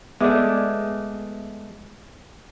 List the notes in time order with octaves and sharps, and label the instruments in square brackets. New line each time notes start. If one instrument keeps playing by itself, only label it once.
[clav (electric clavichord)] G#3 A3 [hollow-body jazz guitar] B3 G#4 D5 [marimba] E5 D6